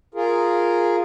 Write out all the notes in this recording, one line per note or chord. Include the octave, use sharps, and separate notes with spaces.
F4 G#4 A#4